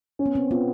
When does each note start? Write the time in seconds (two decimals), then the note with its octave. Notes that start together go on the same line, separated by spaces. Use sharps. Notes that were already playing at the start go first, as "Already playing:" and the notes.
0.19 C#4
0.26 B3
0.35 C4
0.51 B3 F4